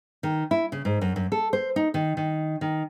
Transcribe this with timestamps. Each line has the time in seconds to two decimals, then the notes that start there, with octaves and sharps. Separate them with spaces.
0.23 D#3
0.51 E4
0.72 C#3
0.85 G#2
1.01 F#2
1.16 F#2
1.32 A4
1.53 C5
1.76 D#4
1.94 D#3
2.17 D#3
2.61 D#3